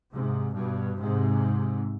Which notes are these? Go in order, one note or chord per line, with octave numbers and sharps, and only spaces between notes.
G#2 C3
G2 B2
G#2 C3